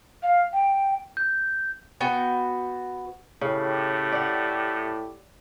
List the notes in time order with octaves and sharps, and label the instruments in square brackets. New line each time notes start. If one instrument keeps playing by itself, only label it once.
[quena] F5
G5
[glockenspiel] G6
[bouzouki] B3 F#4 G5
[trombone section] A2 G4 [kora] C#3
[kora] D5 F#5